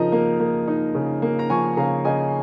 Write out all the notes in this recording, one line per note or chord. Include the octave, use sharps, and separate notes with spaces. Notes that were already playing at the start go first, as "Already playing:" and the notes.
Already playing: C#3 F3 D#4 A#4 D#5 A#5
A#3
A#3
D#4
C#3
A#3
A#5
F3 G#5 C#6
C#3 F5 A#5
C#3 D#5 G#5